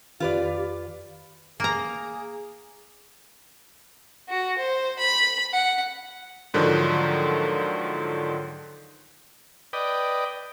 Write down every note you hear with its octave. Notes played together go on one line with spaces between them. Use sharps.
F2 D#3 F4 G4 B4 D5
A#3 G#4 A#5
F#4
C5
B5
F#5
G#2 D3 D#3 F3 F#3
B4 D5 D#5 G5